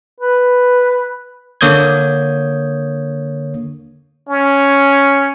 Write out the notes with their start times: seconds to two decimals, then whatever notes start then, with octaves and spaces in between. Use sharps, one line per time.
0.20 B4
1.61 D3 A#3 C#5 D#6 G6 G#6
4.29 C#4